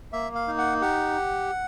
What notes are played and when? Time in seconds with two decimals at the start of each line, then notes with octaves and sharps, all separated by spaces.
0.13 A#3 E5
0.35 F5
0.47 D#4
0.58 F#5
0.81 G4 F#5